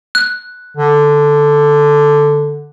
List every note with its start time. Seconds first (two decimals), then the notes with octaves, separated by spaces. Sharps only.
0.15 F#6
0.77 D3